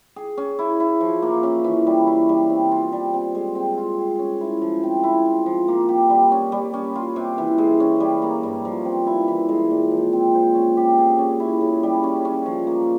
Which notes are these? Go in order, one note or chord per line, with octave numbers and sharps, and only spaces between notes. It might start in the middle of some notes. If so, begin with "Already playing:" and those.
G#4
C#4
E4
E4
F3
A#3
C#4
E3
G3
E4
G3
C4
F4
G3
C4
G#3
C4
F4
G#4
C#4
E4
F3
C4
E4
F4
F3
A#3
G4
G3
C#4
G3
C#4
F4
C3
E3
G#3
C#4
G3
A#3
G2
F3
C4
E4
E3
G#3
A#2
F3
C4
C5
C#4
G4
G#4
C#4
E4
C#3
G3
C#4
C#4
F3
A#3